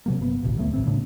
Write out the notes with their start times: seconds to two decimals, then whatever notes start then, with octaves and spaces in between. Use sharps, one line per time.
0.06 C3 F#3 A#3
0.19 G1 B3
0.43 A1 D2 B2
0.57 D#1 F#3 A3 B3
0.74 D#1 A1 B2 C4
0.86 A2 C#3 B3 D4